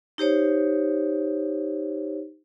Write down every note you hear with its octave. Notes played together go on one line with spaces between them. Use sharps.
D#4 G4 C5 C#5